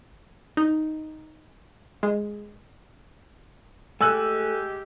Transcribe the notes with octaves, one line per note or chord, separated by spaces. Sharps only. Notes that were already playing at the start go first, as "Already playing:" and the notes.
D#4
G#3
G#3 A3 G4 G#5 E6 F#6